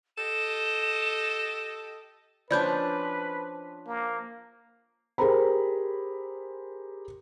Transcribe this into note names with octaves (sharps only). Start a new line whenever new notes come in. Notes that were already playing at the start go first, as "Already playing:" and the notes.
G4 A4 D#5 E7
F3 C#4 D4 B4 D5 B5 G6
A#3
G4 G#4 A#4 C5 A#5 B5